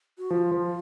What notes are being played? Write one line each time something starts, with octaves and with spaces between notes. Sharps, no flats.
F#4
F3 F4
F3